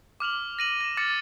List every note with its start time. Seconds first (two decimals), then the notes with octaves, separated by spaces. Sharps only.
0.20 D6 F6 F7 F#7
0.59 A#6 D#7 F#7
0.81 A#6 E7
0.97 D6 F6 A6 C#7